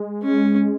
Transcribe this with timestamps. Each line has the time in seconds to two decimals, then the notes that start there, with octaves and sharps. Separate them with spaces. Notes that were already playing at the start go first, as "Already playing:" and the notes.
Already playing: G#3
0.23 C#4